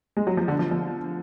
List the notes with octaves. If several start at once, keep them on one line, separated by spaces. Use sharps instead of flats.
G#3
F#3
F3
D3
F3
F3